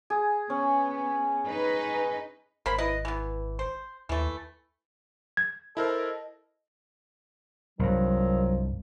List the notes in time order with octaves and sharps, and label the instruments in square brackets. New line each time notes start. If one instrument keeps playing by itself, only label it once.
[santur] G#4
[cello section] B3 [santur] C#4
[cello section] D#4 B4 D#5
[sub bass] G#1 [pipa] A#3 C5 B5
[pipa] E4 B4 D#5
E3 B3
C5
[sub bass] D#2 [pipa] E3 A3
[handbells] G#6
[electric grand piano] E4 A#4 C5 [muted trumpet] A4 [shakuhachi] D#5
[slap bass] C2 G2 [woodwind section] D#3 F3 F#3